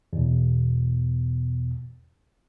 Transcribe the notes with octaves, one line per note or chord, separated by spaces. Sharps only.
E2 B2